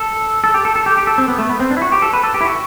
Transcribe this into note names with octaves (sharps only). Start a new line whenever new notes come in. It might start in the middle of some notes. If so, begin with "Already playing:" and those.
Already playing: A4
A4
G4
A4
A4
G4
G4
A4
C4
B3
A3
B3
C4
D4
E4
F#4
G4
A4
B4
A4
G4
E4
F#4